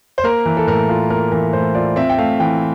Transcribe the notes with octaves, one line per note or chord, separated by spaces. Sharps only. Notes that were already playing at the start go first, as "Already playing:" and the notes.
C5
A#3 A#4
E3
A4
A2 A#4
F4
A#3 A#4
E3 A#4
A2 C5
F4 D5
C4 E5
G5
A3 F5
E3 G5